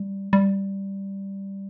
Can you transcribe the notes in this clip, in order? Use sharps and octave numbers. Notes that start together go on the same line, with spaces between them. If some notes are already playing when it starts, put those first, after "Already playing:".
Already playing: G3
G3